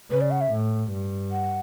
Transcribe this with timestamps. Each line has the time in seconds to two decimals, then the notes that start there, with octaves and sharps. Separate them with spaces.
0.11 C#3 B4
0.21 D5
0.31 F#5
0.41 E5
0.51 A2
0.91 G2
1.32 F#5